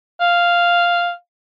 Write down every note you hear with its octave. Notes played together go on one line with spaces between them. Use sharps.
F5